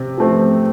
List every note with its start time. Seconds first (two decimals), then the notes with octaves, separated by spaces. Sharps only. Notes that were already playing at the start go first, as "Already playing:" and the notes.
Already playing: C3
0.18 F3 A3 C4